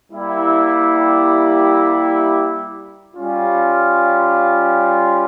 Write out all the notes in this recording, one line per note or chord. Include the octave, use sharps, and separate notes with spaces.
G3 A#3 E4 G4
G3 C#4 F4